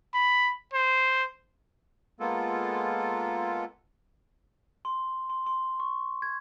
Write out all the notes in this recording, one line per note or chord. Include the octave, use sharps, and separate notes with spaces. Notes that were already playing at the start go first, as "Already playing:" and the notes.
B5
C5
G#3 A#3 B3 F4 A4
C6
C6
C6
C#6
G#6